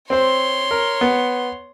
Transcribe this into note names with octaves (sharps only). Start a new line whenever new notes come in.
C4 C5 C#5 C6
A#4
B3